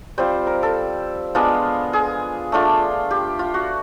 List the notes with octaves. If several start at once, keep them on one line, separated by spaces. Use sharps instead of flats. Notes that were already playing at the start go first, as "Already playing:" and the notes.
G3 C4 F4 C5
A#4
A4
G#3 B3 D4 F4
G#4
A3 D4 F4
G4
F4
F#4